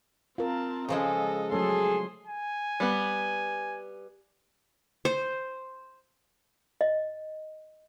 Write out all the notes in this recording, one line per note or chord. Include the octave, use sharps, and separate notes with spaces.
C4 F4 A#4 A5
C#3 F3 G#3 A4 D#5
F#3 A3 C#4 G#4 A4 C6
G#5
G3 B3
C5
D#5